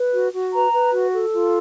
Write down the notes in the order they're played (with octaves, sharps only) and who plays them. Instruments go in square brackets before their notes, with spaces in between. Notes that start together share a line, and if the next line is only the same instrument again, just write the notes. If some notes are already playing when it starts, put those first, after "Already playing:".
Already playing: [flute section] B4
F#4
F#4
B4 A#5
B4
F#4
A4
F4